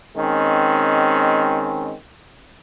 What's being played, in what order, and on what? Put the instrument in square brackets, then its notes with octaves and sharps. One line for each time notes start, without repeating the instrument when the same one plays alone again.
[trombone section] D#3 G#3 C4 C#4